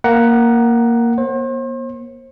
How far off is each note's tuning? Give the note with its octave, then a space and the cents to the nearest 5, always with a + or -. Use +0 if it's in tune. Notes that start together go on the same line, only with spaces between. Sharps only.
A#3 +0 F#5 +10 A#5 +10
A#3 +45 C5 +40